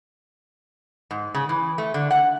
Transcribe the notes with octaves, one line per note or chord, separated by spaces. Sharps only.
G#2
C#3
E3
A3
D3
F#5